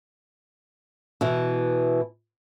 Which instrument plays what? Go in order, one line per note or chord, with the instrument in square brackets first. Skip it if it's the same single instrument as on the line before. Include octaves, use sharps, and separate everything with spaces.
[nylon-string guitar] B2 E3